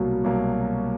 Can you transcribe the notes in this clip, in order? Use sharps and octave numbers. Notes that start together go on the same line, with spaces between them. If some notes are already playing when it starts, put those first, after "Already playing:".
Already playing: C2 B2 F#3 A#3
C2 B2 F#3 A#3